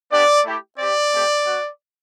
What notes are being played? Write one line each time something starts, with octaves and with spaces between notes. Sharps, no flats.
B3 D4 G4 D5
A3 E4 G4
C4 G4 D5
A3 C4 G4
B3 F#4